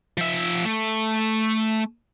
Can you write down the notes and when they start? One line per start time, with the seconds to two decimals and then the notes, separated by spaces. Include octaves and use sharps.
0.18 F3 E5
0.65 A3